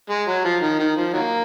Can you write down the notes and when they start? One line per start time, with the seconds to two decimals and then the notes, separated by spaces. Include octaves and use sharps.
0.10 G#3
0.28 F#3
0.44 F3
0.62 D#3
0.79 D#3
0.96 F3
1.13 D#3 F#3 A#3